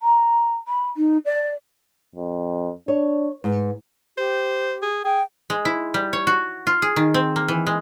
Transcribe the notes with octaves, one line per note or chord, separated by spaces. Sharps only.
A#5
B5
D#4
D5
F2
D4 C#5
G#2 B4
G4 C5
G#4
G#4 G5
G#3
E4
G3
C#5
F#4
F4
G#4
D#3
C4
A#3
E3
G#3